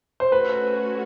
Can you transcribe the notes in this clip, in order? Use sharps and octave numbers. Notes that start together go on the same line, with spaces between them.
C5
A3 C#4 F#4 B4